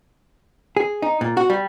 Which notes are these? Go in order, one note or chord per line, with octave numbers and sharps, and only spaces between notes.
G#4
D#4
A#2
F#4
G3